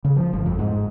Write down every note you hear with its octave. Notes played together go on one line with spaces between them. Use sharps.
C#3
F3
G1
F2
G#2